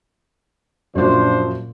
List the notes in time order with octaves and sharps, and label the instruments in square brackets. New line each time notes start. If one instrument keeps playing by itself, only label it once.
[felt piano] F#2 F#4 [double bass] A#2 [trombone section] F3 D4 C5